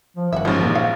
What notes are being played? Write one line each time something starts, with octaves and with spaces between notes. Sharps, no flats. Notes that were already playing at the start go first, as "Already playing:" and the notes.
F3
G1 D#3 F#4 E5
A1 G#2 F3 C#4
A#2 A#3 D#4
F#3 F5 F#5